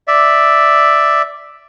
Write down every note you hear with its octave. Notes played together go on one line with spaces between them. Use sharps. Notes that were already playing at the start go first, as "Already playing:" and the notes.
D5 E5